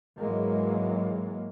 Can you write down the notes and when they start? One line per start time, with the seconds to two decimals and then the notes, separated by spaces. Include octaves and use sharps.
0.18 G#2 E3 F#3 G#3 A#3